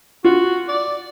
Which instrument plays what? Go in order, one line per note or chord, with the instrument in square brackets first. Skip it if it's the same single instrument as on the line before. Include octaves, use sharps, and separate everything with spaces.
[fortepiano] F4 [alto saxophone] F#4
[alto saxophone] D5